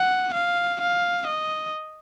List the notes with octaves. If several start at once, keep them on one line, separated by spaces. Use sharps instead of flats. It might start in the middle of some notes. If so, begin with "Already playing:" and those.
Already playing: F#5
F5
F5
D#5